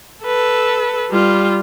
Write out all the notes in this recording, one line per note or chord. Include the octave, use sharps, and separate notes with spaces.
A4 B4
G3 F4